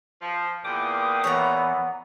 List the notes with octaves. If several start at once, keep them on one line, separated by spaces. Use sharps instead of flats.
F3
E2 A#2 G5 D6 D#6
E3 B3 C#5 F#5 A#5